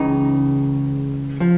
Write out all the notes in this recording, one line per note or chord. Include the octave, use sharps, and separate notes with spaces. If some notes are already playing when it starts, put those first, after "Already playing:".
Already playing: C#2 C#3 E3 D#4
F3